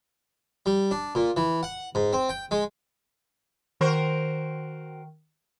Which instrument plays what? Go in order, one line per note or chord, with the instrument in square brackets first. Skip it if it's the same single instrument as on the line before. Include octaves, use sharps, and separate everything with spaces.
[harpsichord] G3
D4
A#2
E3
F#5
G#2
C4
G5
G#3
[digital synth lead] D#3 [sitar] F#4 A#4 C5